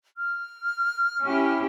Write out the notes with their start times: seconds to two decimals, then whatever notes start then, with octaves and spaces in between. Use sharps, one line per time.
0.17 F6
1.24 C#4 E4 G4